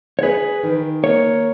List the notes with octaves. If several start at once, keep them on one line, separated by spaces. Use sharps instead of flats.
C#5
G#4 B4
D#3
A#3 C#5